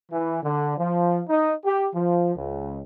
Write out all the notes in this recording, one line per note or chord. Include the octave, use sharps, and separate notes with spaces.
E3
D3
F3
D#4
G4
F3
C#2